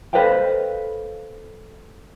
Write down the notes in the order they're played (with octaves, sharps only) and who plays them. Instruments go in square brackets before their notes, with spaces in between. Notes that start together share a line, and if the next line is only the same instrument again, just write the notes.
[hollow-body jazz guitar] A4 B4 C5 D#5 F5 G5